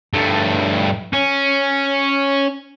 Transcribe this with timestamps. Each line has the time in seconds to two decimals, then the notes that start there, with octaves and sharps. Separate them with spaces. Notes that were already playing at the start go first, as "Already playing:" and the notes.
0.14 G2 A3
1.13 C#4